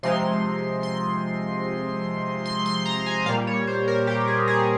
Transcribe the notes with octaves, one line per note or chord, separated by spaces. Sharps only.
C3 F3 G#3 C4 D#4 C6
C6
C6
C6
A#5
G#5
A#2 G3 A#3 F5
C#5
C5
A#4
G4
G#4
G#4